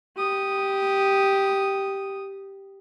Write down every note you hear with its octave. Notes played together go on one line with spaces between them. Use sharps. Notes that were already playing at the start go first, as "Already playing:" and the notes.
G4 D#6